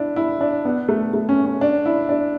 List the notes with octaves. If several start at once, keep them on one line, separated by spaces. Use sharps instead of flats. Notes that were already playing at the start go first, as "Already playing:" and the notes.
Already playing: D4 E4
E4
D4
B3
A3
A3
C#4
C#4
D4
E4
D4